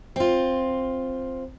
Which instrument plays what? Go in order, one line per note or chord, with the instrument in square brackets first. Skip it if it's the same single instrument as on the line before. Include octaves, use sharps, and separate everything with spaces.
[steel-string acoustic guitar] C4 F4